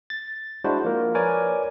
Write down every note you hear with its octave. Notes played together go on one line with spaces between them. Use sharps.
A6
G#3 D4 E4 F#4 C5
F3 A#3 A#4
A#4 B4 C#5 D5 G#5 D6